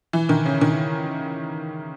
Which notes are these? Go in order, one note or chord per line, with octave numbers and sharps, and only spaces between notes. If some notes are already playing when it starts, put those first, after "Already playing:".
E3
D#3
C#3
D#3